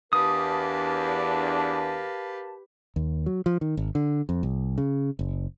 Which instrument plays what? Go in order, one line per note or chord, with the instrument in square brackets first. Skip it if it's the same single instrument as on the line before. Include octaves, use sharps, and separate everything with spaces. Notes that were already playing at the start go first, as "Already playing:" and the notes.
[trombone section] E2 D4 [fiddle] G4 B4 [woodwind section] A#4 F5 A5 [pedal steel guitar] D#6
[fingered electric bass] D#2
F#3
F3
D#3
G#1
D3
F2
C2
C#3
F#1